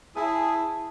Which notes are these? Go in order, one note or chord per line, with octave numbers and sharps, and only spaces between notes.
E4 G#4 A5